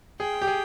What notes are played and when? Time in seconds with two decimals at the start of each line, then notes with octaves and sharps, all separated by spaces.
0.20 G#4 G5
0.42 G4
0.47 G#4